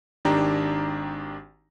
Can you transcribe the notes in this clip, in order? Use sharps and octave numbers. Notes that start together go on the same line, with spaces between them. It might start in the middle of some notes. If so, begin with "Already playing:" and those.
G#1 D#3 D4 G4 A#5